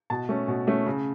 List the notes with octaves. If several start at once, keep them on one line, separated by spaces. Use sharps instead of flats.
B2 A5
A3 C#4
B2
A3 C#4
C#3